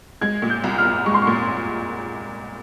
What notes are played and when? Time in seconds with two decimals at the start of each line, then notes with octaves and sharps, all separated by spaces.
0.21 G#3 G#6
0.42 A#2
0.50 G6
0.64 C2
0.78 F6
0.85 C2
1.06 G#3 C#6
1.14 C6
1.22 A#2 C#6